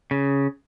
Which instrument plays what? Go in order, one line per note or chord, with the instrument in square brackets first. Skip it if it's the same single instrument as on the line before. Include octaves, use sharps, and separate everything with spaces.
[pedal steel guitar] C#3